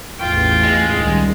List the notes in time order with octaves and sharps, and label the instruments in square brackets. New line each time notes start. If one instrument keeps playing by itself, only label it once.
[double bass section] A1 E2 [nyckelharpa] F4 G5
[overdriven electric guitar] G#3
[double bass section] C#2 D#3 G3